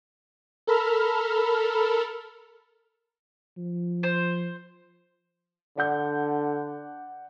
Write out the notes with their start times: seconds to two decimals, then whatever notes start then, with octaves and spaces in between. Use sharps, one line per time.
0.67 A4 A#4 B5 E6 F6
3.57 F3
4.03 C5
5.77 D3 D5 F#5 G6